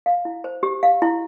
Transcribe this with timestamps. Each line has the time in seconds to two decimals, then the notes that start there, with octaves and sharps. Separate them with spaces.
0.06 F5
0.25 E4
0.44 C5
0.63 G4
0.83 F5
1.02 E4